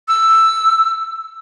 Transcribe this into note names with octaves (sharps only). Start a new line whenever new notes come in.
E6